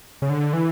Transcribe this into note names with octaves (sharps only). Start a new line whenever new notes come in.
C#3
D3
E3